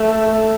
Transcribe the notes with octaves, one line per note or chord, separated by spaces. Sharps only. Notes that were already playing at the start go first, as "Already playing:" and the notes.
Already playing: A3